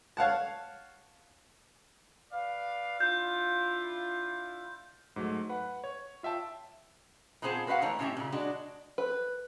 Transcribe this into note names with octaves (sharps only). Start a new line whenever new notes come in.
C#5 F5 F#5 A5
B4 D5 F5
D4 E4 F4 G6
G#2 F#3 A3
B4 F#5
C#5
F4 E5 G5 A5
A#2 B3 C4 G#4 C5 A5
F#4 B4 C5 F5 F#5
E3 G#3 A3 D#4 C#5
A2 C4 C#4 G4 E5
A#2 C#3
G#3 D4 F#4
B4